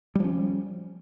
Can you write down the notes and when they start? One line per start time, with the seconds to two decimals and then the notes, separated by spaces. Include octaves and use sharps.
0.15 G3
0.20 F3
0.24 C#4